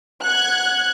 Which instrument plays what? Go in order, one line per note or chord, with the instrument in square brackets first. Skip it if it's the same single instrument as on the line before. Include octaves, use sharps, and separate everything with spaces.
[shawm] F#5 [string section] F#6 G#6